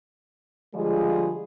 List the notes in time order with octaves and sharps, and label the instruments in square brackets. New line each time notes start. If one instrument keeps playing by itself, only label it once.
[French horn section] D3 F3 G3 G#3 F4 G#4